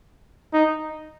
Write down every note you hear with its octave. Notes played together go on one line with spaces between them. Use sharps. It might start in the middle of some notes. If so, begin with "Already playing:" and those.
D#4